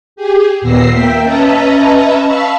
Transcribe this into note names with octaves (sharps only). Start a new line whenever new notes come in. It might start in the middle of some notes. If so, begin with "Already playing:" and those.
G4 G#4
D#2 A#2 B3 E6 A#6 C7
A#3 E5 G5 B6
C#4 B4 D#5 E5 A5 A#5
F5 A5 B5 C#6 E6